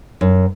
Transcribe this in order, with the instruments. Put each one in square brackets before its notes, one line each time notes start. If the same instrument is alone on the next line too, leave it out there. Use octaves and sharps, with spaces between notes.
[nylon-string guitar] F#2